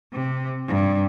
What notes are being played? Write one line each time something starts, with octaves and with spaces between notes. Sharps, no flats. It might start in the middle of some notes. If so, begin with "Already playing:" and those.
C3
G2